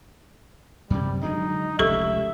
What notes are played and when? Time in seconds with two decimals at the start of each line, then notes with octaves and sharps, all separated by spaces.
0.90 F#2 C3 G3
1.23 D3 F#3 G#3 D#4
1.79 F1 C#2 G4 A4 E5 C#6